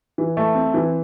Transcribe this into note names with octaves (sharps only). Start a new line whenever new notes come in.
E3
A3
C4
E3